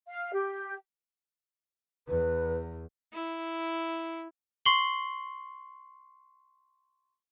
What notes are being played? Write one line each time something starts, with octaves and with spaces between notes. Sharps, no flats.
F5
G4
E2 B4
E4
C6 C#6 C7 F#7 G7